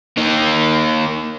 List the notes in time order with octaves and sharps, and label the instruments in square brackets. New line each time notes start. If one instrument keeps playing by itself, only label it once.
[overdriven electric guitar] A#3 D#4